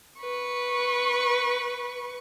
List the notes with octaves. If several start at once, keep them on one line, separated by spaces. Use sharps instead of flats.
B4 C#6